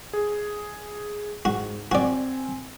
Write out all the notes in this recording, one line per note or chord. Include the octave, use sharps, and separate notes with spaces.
G#4
G#2 F#4
C4 F#4 D5 G#5